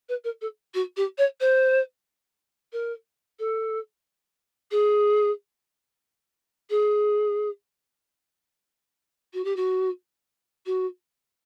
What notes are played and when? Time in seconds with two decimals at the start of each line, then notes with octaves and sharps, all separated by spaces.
0.09 B4
0.24 A#4
0.41 A4
0.74 F#4
0.97 G4
1.18 C#5
1.40 C5
2.73 A#4
3.39 A4
4.71 G#4
6.70 G#4
9.33 F#4
9.44 G4
9.56 F#4
10.66 F#4